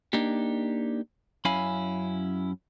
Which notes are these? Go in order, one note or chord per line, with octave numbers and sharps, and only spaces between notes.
A#3 D4 D#4 G4
F#2 C#4 E4 F5 G#5 B5